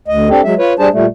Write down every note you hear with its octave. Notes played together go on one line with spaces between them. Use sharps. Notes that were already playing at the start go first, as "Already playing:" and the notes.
D2 D#5
C4 D4 G4 A4
F#3 G#3 E5
F4 B4 C#5
G3 D4 G#4 C5 A5
A#2 G3 A3